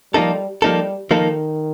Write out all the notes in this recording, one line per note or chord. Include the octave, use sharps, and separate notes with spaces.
F3 G3 A#3 D#4 A4
F3 G3 A#3 D#4 A4
D#3 F3 A#3 D#4 A4